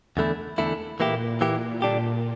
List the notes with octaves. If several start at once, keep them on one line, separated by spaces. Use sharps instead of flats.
E2 D3 A3 E4
E2 D3 A3 E4
A#2 E3 A#3 E4 G4
A#2 E3 A#3 E4 G4
A#2 D3 G3 D4 G4